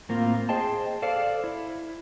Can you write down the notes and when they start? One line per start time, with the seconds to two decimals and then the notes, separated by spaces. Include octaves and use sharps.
0.09 A2 A#3 C4 F4
0.49 G#4 C5 D#5 G5 A5
1.02 A4 C5 D5 F5
1.44 E4